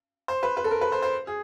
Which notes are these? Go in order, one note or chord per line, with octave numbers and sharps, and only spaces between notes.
C5
B4
B4
A4
A#4
B4
C5
C5
G#4